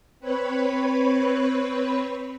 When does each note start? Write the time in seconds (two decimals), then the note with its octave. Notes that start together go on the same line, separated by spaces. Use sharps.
0.20 C4 B4 C#5 B5